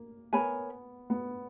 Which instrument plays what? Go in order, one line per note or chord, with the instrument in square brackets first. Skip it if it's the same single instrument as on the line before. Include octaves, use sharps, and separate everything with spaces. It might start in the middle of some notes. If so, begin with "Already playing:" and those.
Already playing: [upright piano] A#3
[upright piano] B3 [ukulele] A#4 C#5 G#5 B5
[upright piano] B3